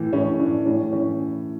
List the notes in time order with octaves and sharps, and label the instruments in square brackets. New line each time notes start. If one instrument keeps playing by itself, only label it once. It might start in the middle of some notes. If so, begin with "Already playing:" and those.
Already playing: [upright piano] A2 E3
A2 C#4
E3 D4
A2 C#4
E3 C#4